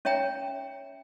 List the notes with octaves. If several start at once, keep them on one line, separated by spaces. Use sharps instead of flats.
C#4 C#5 E5 G5 A#5